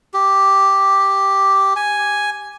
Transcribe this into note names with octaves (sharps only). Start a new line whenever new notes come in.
G4
G#5